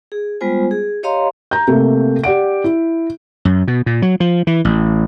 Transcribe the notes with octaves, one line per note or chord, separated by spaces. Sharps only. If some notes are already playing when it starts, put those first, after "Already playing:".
G#4
G3 G#3 B3 F4 C5 G#5
G#4
G4 C#5 D#5 F5 A#5 C6
A#5 G6
C3 A3 A#3
G4 D5 F#5 D7
E4
F#2
B2
A#2
F#3
F3
E3
A1